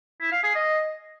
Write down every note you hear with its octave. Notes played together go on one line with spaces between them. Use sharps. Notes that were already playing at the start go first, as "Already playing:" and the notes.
E4
F5
G#4
D#5